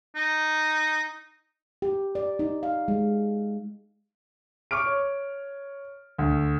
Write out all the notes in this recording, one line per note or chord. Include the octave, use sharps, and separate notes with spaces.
D#4
G4
D5
D#4
F5
G#3
C#6 D6 F6 D7
C#5
D2